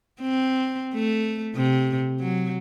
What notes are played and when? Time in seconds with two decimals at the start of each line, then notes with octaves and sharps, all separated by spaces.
0.21 C4
0.95 A3
1.56 C3
2.20 F#3